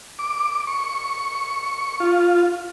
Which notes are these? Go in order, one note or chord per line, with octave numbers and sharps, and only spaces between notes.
D6
C#6
F4